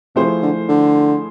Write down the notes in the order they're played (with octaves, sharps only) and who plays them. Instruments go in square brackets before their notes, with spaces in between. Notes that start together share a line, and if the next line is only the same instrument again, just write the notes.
[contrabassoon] C3 [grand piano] F3 A3 E4 G#4 C5
[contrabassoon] D3
D3